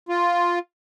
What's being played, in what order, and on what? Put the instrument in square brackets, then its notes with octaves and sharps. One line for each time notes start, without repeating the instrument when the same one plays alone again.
[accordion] F4